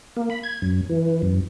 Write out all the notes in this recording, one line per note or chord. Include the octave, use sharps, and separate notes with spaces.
A#3
B5
G#6
F#2
E3
F#2